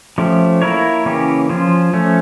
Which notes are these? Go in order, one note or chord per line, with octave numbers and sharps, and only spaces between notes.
F3 A3 C#4 G4
A#3 E4 A#4 C#5
C#3 E3 A#3 C#4 G4
F3 C#4 F4
F3 A3 C#4